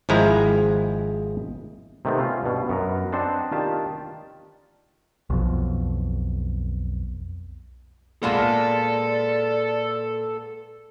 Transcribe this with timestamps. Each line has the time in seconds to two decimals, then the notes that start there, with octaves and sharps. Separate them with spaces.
0.09 G#1 F3 G#3 E4 A#5
2.05 C3 D#3 A3 B3 C4
2.20 C#4 F4
2.43 G2 B2
2.69 F#2 B3 A#4
3.12 C4 D4 C5 D#5 F#5 A5
3.52 D#3 D4 F4 G4 A5
5.30 B1 F2
8.23 A#2 G#3 A#3 B3 A4 D5 A5 E7